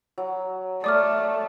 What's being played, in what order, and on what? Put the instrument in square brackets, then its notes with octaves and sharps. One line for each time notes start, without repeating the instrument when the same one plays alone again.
[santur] F#3
[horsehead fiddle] A3 [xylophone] D5 D6 F6 [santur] D#6